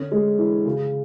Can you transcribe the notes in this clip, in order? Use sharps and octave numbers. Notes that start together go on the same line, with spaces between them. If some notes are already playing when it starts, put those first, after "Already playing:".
Already playing: D3 C#4
G#3
E3
C#3